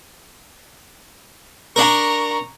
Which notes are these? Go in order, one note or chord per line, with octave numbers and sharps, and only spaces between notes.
D4 A#4 A#5 C#6